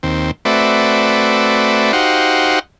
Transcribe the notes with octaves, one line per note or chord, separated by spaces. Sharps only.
D#2 C4
A3 C4 F#4 B4 D5 E5
D#4 F#4 G4 C5 F5 F#5